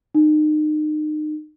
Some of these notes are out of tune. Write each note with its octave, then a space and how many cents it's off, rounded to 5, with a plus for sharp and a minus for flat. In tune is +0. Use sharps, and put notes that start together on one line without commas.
D#4 -35